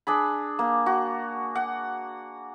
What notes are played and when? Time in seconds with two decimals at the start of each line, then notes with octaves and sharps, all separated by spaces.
0.07 D4 G#4 B5
0.59 A#3
0.86 F#4
1.55 F#5